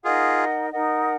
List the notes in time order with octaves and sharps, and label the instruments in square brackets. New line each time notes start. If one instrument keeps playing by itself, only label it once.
[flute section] D#4 A#4 D#5 F#5 [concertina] F4 G#4
[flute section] D#4 A#4 D#5 F#5